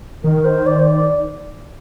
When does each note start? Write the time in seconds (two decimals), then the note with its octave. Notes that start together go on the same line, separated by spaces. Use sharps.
0.24 D#3 A#4
0.45 C5
0.66 D5
0.79 C5
0.87 D5